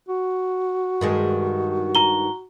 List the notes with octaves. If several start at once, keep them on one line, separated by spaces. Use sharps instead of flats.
F#4
G2 D#3 G#3
A#5 G7